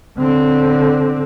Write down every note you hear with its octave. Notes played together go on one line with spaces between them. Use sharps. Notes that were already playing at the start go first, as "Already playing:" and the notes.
D3 C4